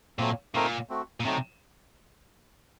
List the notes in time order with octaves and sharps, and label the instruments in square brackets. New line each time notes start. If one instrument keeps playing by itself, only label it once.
[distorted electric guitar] A#2 [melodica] F#3 A3 C4
[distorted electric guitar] A#2 [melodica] A3 C4 D#4 A#4
[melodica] A3 C4 F#4
[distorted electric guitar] A#2
[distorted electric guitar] C3 [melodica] F#3 A3 D#4